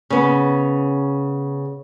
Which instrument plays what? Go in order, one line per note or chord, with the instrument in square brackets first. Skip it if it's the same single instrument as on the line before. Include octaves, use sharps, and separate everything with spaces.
[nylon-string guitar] C#3 B3